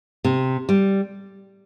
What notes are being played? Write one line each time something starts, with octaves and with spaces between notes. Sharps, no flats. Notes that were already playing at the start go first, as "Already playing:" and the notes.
C3
G3